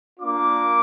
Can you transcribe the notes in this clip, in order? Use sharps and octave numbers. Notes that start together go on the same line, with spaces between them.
A#3 D4 F4 D6